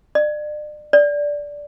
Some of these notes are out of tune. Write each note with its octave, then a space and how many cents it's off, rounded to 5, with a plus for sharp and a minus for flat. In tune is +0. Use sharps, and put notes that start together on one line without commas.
D5 +35
D5 -10